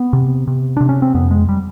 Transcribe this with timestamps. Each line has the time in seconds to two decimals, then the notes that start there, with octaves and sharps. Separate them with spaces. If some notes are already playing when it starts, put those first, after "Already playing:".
Already playing: B3
0.13 C3
0.47 C3
0.77 C3 D4
0.89 C#4
1.02 C4
1.14 F2 B3
1.31 G#3
1.49 G3